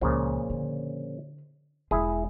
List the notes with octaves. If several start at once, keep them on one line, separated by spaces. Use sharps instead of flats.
C#2 A#2 C#3 F3
D3
E1 G#3 E4 G#4